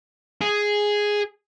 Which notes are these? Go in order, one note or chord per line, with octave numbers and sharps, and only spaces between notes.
G#4